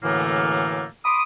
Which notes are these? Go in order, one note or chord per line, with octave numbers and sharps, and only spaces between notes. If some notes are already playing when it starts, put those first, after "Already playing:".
F#2 A2 D3 E3 A3 A#3
B5 C6 D6 D#6